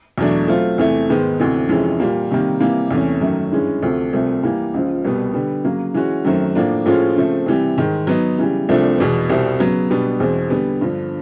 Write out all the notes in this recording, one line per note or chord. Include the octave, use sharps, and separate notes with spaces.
E2 B2 F#3 A3 D4
F#3 A3 C4 F4
E2 C3 E3 A3
G#2 D#3 G#3 B3
D2 C3 E3
F2 C3 E3 G#3 C#4
A#2 G3 A#3
C3 D#3 G3 A#3
C3 E3 G3 A#3
E2 C3 E3 A3 C#4
F#2 D#3 F#3 A3 C#4
G2 E3 G#3 C#4
D2 C3 F3 A3
C2 C3 F3 A3
E3 G3 A#3
C#2 C#3 F3
C2 B2 G3 B3
D3 G3 B3
C#3 F#3 A#3
E3 G#3 C#4 F#4
F#2 D#3 F#3 A3 C4
A2 F3 A#3 D4
A2 F3 G#3 C#4 F4
C#3 F3 A3 C4
C3 E3 G3
G#2 D#3 G#3
F#3 B3 D#4
C#3 E3 G3
C2 C3 F3 A3 D4
E2 B2 G#3 B3
C2 B2 G3 C4 E4
C#3 F#3 B3
B2 G3 B3 D4
E2 B2 G#3 C4
D3 G3 B3
G2 D3 F3